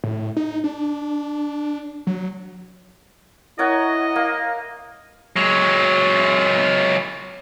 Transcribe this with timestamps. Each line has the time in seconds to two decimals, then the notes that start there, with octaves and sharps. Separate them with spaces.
0.04 A2
0.37 D#4
0.64 D4
2.07 F#3
3.59 E4 A#4 C#5 D#5 F#5
4.16 A#3
5.36 F#3 G#3